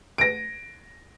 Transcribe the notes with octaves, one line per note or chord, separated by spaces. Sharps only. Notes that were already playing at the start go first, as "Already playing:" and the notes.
A#6 D7